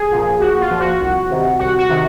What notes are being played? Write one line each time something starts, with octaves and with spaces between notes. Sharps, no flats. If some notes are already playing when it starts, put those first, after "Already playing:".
Already playing: G#4
A#2 F3
A#1 F#4
F4
A#2 F3
F#4
C2
C3 D#3
C2 F#4
F#4
C3 D#3